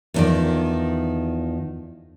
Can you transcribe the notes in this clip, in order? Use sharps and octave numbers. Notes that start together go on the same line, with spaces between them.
E2 A#2 D#3 F3 D5